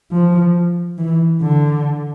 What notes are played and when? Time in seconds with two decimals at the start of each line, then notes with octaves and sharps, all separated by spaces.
0.11 F3
0.98 E3
1.41 D3